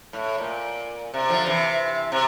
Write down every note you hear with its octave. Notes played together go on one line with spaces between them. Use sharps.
A2
A#2
C3
D3 F3
C3 E3
C3